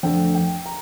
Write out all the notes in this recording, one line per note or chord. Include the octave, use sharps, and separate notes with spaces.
F2 D3 A3 G5
G5
A#5